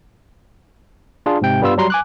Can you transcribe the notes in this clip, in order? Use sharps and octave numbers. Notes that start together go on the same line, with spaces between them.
D4 F4 G#4
G#2 C3 G5
G2 G3 B3 F4 E6
F#3 G3 A#5 C6 C7
G#5 D6 F#6